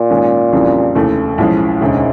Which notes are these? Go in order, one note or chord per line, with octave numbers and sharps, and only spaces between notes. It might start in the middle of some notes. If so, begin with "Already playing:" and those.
Already playing: A#2
G#2 D#3 G#3 C#4
F2 C#3 E3 G3
F1 D#2 C#3 E3 A3
B1 A2 F3 G#3 C#4
E1 D2 G#2 C#3